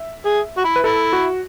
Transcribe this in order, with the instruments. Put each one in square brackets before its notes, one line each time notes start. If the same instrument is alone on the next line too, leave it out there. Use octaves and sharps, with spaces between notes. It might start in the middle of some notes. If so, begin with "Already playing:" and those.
Already playing: [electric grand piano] E5
[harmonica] G#4
F#4
E4
[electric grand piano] B4
[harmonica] E4 [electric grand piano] A4
[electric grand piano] F#4